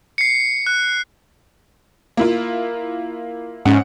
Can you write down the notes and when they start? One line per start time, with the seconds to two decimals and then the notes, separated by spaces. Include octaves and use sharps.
0.18 C7 C#7
0.67 F#6
2.17 A#3 E4 F4
3.65 G#2 C#4 F#5